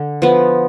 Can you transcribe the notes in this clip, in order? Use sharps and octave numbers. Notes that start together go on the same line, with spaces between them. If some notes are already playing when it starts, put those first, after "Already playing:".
Already playing: D3
F3 B3